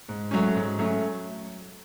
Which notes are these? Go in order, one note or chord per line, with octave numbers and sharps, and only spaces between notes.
G#2
F#3 A3 C#4
G#2
F#3 A3 C#4